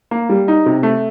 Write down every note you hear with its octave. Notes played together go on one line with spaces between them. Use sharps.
A#3
G3
D#4
C3
A3